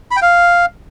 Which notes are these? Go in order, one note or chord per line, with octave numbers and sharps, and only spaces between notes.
B5
G5
F5